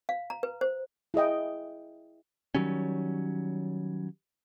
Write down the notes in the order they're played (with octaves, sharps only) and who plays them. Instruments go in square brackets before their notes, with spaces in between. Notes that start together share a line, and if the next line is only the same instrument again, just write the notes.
[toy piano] F5
A#5
B4
C5
[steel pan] E4 G#4 D#5 G5
[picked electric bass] D#3 F#3 G3 C#4